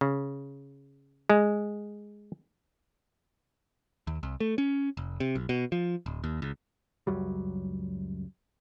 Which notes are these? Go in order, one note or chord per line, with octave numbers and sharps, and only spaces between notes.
C#3
G#3
D#2
C2
A3
C#4
F1
C3
B1
B2
F3
D1
D#2
C#2
C#2 F#2 F#3 G3